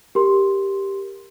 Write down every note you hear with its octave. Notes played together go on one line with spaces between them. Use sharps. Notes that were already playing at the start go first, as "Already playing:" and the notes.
G4 A#4 C6